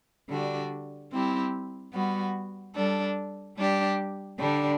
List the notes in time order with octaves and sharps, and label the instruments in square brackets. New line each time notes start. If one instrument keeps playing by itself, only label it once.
[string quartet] D3 G3 D4 F#4
G3 C4 E4 G4
G3 B3 F#4
G3 D4 A4
G3 D4 G4
D3 G3 D4